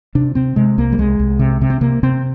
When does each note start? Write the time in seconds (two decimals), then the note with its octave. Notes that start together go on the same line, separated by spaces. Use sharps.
0.15 C3 D4
0.35 C3 C4
0.56 C3 G#3
0.78 C2 A#3
0.92 G3
0.98 C2 G#3
1.19 C2
1.39 C3
1.61 C3
1.70 C4
1.81 C3 A#3
2.03 C3 C4